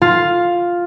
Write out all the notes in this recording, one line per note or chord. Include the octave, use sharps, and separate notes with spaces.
F4